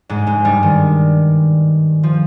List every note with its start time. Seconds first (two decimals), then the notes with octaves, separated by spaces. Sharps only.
0.09 G#2 G#3
0.27 G#2 G#3
0.45 G2 G3
0.63 D#3
2.03 F3